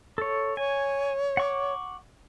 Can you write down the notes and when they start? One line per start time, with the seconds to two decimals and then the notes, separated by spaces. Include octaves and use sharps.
0.18 A4 C#5
0.57 C#5 G#5
1.37 F#5 C#6 D6